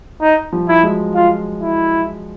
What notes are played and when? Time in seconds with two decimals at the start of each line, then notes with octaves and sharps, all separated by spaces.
0.21 D#4
0.52 F3 G3
0.69 E4
0.83 F#3 G#3
1.15 F4
1.61 E4